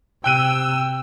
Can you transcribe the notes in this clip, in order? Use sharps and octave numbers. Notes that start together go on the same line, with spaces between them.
C3 G5 E6 F#6 D#7